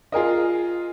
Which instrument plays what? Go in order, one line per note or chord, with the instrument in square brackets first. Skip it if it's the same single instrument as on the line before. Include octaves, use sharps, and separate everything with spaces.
[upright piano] F4 G#4 A#4 D#5